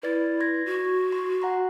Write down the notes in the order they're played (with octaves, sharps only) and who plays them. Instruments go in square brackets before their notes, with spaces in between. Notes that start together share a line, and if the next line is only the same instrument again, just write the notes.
[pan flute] E4 [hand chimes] B4 D5 A6
[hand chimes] C6 G#6 A#6
[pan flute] F#4
[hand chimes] C6
F#5 A#5 C6